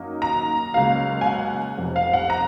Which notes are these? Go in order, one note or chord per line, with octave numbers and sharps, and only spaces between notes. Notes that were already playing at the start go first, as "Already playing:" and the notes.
Already playing: F#2 D#3 F#3 A#3 D#4
A#5
C#2 C#3 F#3 A#3 F5
G#5
F#5
F1 F2 C3
F5
F#5
A#5